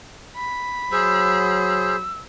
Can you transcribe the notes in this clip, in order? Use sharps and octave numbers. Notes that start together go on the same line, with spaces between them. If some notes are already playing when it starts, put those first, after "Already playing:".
B5
F#3 G#4 C5 E6